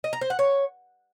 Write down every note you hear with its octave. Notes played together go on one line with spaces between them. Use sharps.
D#5
A#5
C5
F#5
C#5